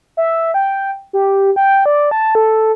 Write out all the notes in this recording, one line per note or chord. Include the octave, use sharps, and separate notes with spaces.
E5
G5
G4
G5
D5
A5
A4